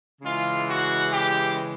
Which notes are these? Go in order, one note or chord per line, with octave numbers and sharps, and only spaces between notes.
C#3 E3 G#3 F4
F#4
G4